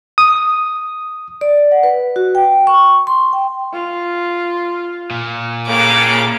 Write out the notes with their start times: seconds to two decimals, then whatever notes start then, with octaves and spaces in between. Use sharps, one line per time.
0.18 D#6
1.41 D5
1.72 F#5
1.83 B4
2.16 F#4
2.35 G5
2.67 C#6
3.07 C6
3.33 G5
3.73 F4
5.11 A#2
5.68 A2 C#3 A#3 D6